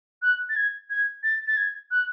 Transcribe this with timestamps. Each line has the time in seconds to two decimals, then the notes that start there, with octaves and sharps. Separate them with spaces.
0.22 F#6
0.49 A6
0.56 G#6
0.90 G#6
1.23 A6
1.47 A6
1.57 G#6
1.91 F#6